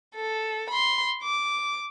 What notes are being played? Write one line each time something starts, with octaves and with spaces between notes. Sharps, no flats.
A4
B5 C6
D6